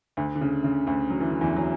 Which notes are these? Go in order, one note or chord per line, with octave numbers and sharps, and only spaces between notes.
D2 D3
D3
C#3
C#3
D2 D3
F#3
E3
D3
E2 E3
F#3